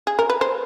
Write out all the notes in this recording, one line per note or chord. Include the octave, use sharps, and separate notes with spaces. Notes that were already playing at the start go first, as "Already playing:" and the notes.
G#4
A#4
B4
C5